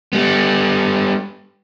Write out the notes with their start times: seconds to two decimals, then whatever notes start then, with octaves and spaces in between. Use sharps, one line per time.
0.13 G3 B3